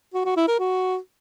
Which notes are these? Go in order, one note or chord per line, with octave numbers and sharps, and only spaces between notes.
F#4
F#4
E4
A#4
F#4